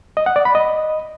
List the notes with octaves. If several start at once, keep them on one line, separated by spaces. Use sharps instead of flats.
D#5
F#5
D5
B5
D#5